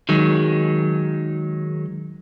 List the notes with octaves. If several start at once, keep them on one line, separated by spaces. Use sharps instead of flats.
D#3 F#3 G#3